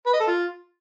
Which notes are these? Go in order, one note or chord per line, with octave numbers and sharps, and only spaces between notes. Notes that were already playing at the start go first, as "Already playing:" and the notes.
B4
D#5
A4
F4